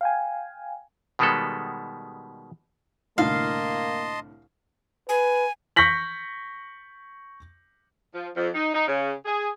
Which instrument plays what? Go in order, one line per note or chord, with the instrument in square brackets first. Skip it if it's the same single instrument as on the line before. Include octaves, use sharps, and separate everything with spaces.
[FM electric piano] F5 G5 G#5
[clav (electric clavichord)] B2 D#3 G3 G#3 B3 A4
[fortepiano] C2 A2 D3 [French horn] A#3 [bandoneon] D#5 A5 C6 [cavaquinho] F5
[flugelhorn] B4 [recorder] G#5
[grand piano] C#6 G6 A#6 B6 F#7
[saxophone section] F3
F2
D#4
D#4
C#3
G#4